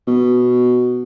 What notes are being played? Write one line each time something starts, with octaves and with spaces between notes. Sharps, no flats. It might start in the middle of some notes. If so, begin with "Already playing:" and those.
B2